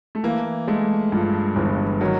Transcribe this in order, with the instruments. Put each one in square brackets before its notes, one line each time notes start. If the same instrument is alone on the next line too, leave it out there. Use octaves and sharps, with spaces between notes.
[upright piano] A3
[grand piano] E3 [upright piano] A#3
[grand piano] G#3 [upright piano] A3
[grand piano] G2 [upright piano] F3
[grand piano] G1 [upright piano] E3
[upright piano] D#3 [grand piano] F#3